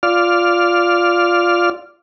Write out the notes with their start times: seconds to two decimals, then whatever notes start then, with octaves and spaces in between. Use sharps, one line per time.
0.03 F4 D5 F6